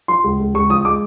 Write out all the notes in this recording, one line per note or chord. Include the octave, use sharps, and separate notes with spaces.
F3 C6
C#2
C#2
C#2 C#6
F3 D#6
G#3 D6